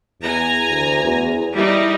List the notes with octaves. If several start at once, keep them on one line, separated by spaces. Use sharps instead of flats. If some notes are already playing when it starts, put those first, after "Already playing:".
E2 G#5 A#5
D2
E2
G3 D#4 E4